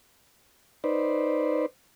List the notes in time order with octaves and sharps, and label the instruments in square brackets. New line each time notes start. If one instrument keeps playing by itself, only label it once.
[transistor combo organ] D#4 B4 C5 D5